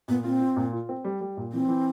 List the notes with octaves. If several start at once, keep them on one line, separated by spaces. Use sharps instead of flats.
A#2 B3
C4 F4
F4
A#2
F4
C4
G3
G3
A#2
E3 C4
E3